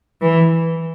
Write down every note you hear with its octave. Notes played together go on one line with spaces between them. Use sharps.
E3